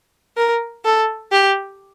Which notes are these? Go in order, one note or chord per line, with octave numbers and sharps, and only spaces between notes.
A#4
A4
G4